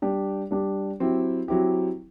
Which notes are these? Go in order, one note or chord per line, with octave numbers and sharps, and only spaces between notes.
G3 D4 G4
G3 D4 G4
F#3 C4 E4 G4
F#3 C4 E4 G4